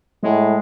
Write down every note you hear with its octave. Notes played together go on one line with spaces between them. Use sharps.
A2 G#3